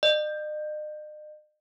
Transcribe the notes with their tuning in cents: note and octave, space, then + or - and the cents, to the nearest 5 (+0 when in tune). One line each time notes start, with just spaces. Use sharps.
D#5 -45